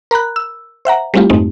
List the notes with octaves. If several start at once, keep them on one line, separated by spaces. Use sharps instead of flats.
A#4 A#5 B5 F#6
E6
C5 E5 F#5 A#5
G3 A3 C4 E4 F4 G4
F2 G#2 G#3 A3 C4 D#4